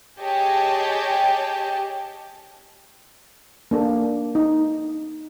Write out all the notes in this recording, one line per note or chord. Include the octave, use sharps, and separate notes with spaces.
G4 G#4 C#5 D#5 G5 A5
A#3 D4 A4
D#4